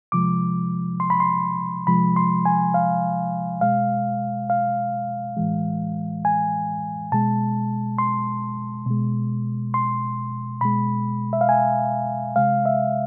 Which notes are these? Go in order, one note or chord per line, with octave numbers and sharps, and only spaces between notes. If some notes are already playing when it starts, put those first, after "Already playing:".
C3 F3 G#3 D6
C6
B5
C6
C3 F3 G#3 B5
C6
G#5
F5
B2 G#3 F5
F5
A2 E3 G#3
G#5
B2 G#3 A5
C6
B2 G#3
C6
B2 G#3 B5
E5
F5
G#5
C3 G#3 F5
E5